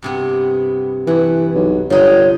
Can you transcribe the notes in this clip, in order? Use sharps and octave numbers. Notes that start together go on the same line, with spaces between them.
G2 C3 B3
G2 E3 F#5
B1
G1 F3 D#4 C#5 D#5